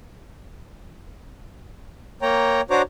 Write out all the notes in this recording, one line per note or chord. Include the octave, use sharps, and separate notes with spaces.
A#3 C#5 G5 A#5
D4 F#4 C5 C#5 A#5 D6